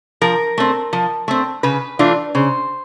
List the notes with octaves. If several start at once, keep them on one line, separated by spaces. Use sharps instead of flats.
F3 A#4
A3 C4
F3
A3 C4
C#3 B4
E3 A3 D4 F4
C#3 C5